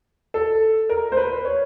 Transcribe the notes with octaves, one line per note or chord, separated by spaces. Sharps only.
A4
A#4
C5
B4
C#5